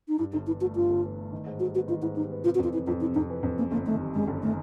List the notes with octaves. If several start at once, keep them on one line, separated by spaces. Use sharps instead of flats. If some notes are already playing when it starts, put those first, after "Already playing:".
D#4
G2 E4
G1 D#4
E3 E4
A3 F#4
G2 F4
G1
E3
A3
D#3
G#2
G3 F#4
B3 F#4
D#3 F4
G#2 E4
G3 D#4
B3
C3 F4
F#4
F2 F4
E3 E4
F2 F4
C3 E4
F2 D#4
E3
F2
F#2 A#3
G1 A#3
D#3 A3
G3
F#2 G#3
G1
D#3 A3